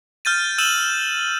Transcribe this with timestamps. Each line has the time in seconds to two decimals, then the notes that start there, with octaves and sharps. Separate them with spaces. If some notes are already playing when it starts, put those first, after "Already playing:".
0.25 F6 G6 A6 D#7
0.58 E6 G6 D#7 E7 F#7